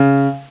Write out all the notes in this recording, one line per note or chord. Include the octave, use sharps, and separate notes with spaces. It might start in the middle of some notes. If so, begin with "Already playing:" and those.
Already playing: C#3